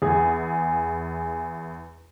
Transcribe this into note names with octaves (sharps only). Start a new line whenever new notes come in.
E2 G#4